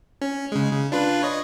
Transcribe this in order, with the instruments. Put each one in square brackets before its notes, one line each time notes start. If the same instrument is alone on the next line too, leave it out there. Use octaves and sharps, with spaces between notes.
[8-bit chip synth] C#4
C#3 G#3
C#3
D4 F4 B4
C#5 D#5